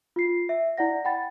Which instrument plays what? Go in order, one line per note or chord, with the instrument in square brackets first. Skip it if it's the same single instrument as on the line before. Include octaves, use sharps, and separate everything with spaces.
[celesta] F4 C7
E5
E4 D5 F#5 A#6
F#5 G5 B5 A6